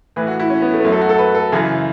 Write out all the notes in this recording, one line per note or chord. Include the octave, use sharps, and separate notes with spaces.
A2 E3 B4
F#4
E4
C#4
B3
A3
B3
F#2 F#3 A3
A4
F#4
A4
B4
A4
F#2 C#3 E3